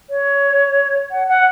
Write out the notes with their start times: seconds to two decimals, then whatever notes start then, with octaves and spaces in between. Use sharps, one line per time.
0.10 C#5
1.11 F#5
1.28 F#5